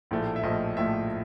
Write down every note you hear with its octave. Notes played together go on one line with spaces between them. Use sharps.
A#1 A2 F3 A3
E5
A#1 A2 F3 A3 D#5
A#1 A2 F3 A3 E5